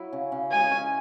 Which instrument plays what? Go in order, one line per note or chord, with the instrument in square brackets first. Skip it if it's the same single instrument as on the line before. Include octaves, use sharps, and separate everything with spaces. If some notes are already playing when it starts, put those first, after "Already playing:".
Already playing: [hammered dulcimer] F#3 E4
C#3
C#3
[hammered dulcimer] G#3 [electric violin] G#5
[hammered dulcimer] C#4